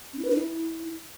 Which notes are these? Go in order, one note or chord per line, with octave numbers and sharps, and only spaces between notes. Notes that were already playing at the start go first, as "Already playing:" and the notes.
C#4
E4
B4
D4
E4